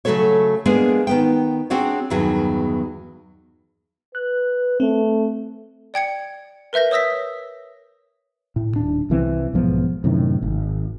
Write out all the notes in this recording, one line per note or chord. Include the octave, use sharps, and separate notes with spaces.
C#3 F#3 A3 F#4 A4 C#5
G#3 A#3 B3 D4 G#4 A#4
D#3 B3 G5
C4 D4 F#4 G#4 C#5
E2 G2 D#3 F#3 G#4
B4 F#6
A3 C4
D5 G5 G#6 C#7
A#4 B4 E5 G6 A#6
C#5 D#6 E6 A#6 B6
A2
D#1 D4
C2 E3 C4
B1 G#2 F3 B3
F#2 A2 C3 D#3
G#1